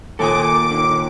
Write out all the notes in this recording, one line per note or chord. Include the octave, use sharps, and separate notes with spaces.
D#2 A#2 A4 G#5 D6 D#6
D3 D#3